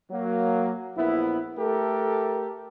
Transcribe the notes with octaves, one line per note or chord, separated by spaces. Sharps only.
F#3 A#3
A#1 B3 E4
A3 G4 A4 A#4